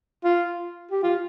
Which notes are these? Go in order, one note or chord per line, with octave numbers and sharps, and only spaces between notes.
F4
G4
F4